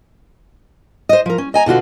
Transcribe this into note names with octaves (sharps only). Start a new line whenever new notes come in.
C5 D#5
F3 A#4
C#4
D#5 G#5 A#5
B2 D3 F4 F#4